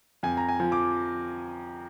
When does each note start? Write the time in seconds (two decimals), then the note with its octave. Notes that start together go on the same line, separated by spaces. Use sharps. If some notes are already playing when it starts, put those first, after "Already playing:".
0.23 F2 G#5
0.37 A#5
0.49 G#5
0.60 F3
0.72 D6